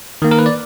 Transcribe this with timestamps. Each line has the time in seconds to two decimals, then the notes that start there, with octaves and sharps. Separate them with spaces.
0.22 D#3 A#3
0.31 A#4
0.39 B4
0.46 D5